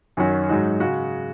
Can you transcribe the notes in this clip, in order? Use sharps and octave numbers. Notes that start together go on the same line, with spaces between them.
F#2 D#3 F#3 C#4 F#4
G#2 F#3 D#4 F#4
C#3 G#3 F#4